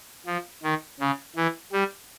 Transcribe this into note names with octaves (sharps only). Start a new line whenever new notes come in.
F3
D#3
C#3
E3
G3